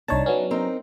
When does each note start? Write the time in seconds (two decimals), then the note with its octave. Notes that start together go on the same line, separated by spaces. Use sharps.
0.08 C2 D4 D#4 C#5 A5
0.26 F#3 B3 C#4
0.51 C4 D#4 A#4